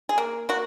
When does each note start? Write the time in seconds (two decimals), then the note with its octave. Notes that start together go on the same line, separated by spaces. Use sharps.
0.09 G#4
0.18 A#3
0.49 A#3 F#4